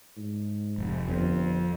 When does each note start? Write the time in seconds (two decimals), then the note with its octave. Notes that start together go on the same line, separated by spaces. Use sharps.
0.17 G#2
0.78 F1
1.08 G1 F2